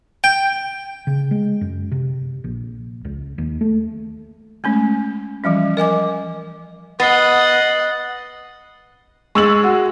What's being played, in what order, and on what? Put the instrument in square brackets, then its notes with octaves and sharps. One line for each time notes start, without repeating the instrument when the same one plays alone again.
[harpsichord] G5
[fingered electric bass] C#3
G#3
F#2
C3
A#1
C#2
D#2
A3
[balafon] G#3 A3 C#4
E3 F3 G3 C#4
A#4 D#5 G#5 D6
[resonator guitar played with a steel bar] B3 [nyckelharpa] D#5 F#5 [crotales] A6 C7 G7
[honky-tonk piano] G#3 E6 F#7 [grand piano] C#6 A6
[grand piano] F#4